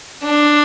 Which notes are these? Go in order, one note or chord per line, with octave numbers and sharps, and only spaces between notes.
D4